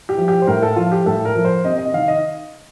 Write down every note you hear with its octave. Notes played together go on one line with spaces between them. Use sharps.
G4
F3
G4
C5
A2 A#4
A4
F3 F4
G4
A2 A4
A#4
F3
C5
C3 D#5
D#5
D#3 F5
D#5